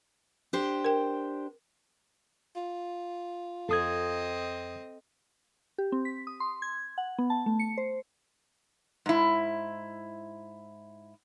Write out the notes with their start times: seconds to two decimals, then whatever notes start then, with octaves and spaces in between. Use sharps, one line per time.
0.53 D4 G4 C5
0.85 A#4 G5
2.56 F4
3.69 F2 C4 A4 D#5 D#6 G#6
5.78 G4
5.92 C4
6.05 B6
6.27 D#6
6.40 C6
6.62 G#6
6.98 F#5
7.19 B3
7.30 A5
7.46 A3
7.59 C#7
7.78 C5
9.06 G#2 E4